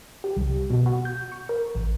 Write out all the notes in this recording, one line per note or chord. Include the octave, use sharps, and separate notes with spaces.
G4
C2
B2
F#4
G6
C#6
A#4
A1